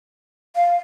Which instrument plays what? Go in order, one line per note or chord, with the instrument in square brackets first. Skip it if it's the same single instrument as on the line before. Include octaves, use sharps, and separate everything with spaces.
[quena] F5